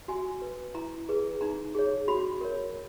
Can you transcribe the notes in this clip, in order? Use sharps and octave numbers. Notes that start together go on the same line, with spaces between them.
F#4 G#5
B4
E4 A#5
G#4 B4
D#4 A#5
G#4 C#5
F#4 B5
A#4 C#5